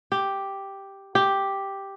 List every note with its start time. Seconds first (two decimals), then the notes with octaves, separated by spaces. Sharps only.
0.12 G4
1.15 G4